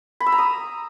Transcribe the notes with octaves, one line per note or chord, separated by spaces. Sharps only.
B5
E6
A#5
D#6